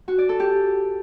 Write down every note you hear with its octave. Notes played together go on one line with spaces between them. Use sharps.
F#4
D5
A4
G4